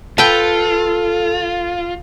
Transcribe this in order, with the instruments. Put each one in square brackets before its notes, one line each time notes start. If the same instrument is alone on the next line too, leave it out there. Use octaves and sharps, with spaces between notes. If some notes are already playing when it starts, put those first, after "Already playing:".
[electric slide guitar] F4 [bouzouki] A4 [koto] B4 G5